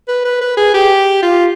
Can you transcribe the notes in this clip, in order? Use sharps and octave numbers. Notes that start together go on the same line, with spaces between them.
B4
B4
B4
G#4
G4
F4